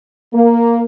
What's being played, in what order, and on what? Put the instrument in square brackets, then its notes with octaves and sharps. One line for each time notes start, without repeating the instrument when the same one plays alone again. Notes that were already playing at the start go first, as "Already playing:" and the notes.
[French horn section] A#3